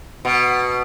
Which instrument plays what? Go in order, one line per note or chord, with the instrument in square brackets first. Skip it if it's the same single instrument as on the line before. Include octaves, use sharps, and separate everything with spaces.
[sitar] B2